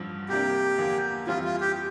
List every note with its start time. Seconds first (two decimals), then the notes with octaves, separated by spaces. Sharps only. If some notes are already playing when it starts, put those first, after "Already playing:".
Already playing: A1 G2 F3
0.29 C2 C3 G3 A#3 D4 G4
0.78 E2 D3 F3 A#3 F4
1.27 F2 E3 G3 C4 E4 F4
1.44 F4
1.60 G4